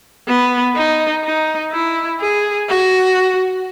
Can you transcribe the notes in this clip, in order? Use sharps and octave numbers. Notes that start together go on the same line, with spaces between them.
B3
D#4
D#4
E4
G#4
F#4